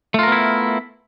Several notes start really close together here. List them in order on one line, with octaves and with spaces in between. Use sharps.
A3 F4 A#4 B3 E4